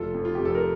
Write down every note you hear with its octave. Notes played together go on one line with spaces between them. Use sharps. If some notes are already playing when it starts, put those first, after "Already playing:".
Already playing: F1 F4 A4
F2
F4
F2 G4
A4
A#4